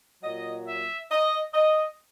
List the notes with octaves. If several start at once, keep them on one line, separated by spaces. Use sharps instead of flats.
A#2 F#3 D#5
E5
D#5
D#5